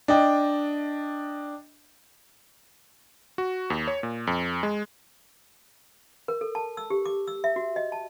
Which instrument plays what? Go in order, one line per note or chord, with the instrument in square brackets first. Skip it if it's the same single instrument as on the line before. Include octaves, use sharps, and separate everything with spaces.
[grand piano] D4 D#5 G5
[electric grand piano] F#4
D#2
C#5
A#2
F2
G#3
[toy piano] A#4
A4
A5
E6
G4
D6
E6
E5
F#4
D#5
A5